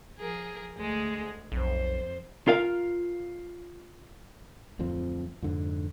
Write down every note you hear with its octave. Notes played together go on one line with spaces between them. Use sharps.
F3 G#4 A#4
D2 G#3 G#4
B1 F2 C5
F4 A#4 F5
D1 F2 F3 C4
F2 G#2 D3